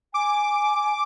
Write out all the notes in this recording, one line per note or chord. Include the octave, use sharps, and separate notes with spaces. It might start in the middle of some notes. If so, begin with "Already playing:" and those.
G#5 D6